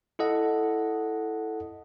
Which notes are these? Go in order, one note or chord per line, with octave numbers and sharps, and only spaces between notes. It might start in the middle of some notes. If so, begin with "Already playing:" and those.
E4 A4 D#5 F#5